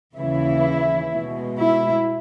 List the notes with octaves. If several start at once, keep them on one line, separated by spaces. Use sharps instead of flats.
D#2 C#3 E3 E4
B2 G#3
E4